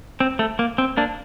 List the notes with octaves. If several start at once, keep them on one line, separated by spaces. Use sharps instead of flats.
C4
A3
A#3
C4
A#3 D4